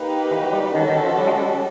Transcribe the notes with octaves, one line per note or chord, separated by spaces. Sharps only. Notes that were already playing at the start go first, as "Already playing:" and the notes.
Already playing: A#3 D#4 G4 B4
E3
F#3
G3
G3
D#3 C#4 F#4 A4
D#3
F3
G3
G#3
G3